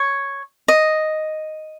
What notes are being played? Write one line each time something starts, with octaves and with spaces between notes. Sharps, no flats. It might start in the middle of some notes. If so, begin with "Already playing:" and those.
Already playing: C#5
D#5